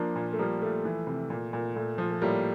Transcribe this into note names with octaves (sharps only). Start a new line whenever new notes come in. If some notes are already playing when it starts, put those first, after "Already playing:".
Already playing: F3 A#3 D4
A#2
A3
F3 G3 A#3
F3 A3
E3
C3
A#2
A#2
A#2 A3
F3
A3
A2 G3 A#3